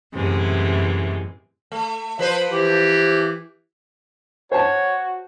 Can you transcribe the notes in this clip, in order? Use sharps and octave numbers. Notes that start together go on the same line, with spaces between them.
F#2 A2 C3 E3 G#3
A3
F3 B4 C5
E3 G4
F#4 C5 C#5 A5